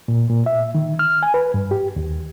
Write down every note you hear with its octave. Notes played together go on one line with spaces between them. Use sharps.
A#2
A#2
E5
D#3
F6
G#5
B4
G2
G4
D#2